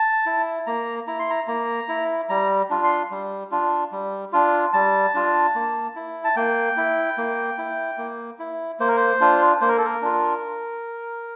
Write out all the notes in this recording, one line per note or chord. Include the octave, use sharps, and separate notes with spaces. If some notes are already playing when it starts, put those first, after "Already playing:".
Already playing: A5
E4
A#3 A#5
E4 A#5
C6
A#5
A#3 A#5
E4
G3 A#5
D4 F4
C6
G3
D4 F4
G3
D4 F4
G3 A5
D4 F4
A#3
E4
A5
A#3 G5
E4
A#3
E4
A#3
E4
A#3 C5
A#4
C5
D4 F4
A#3 C5
A#4
A4
A#4
D4 F4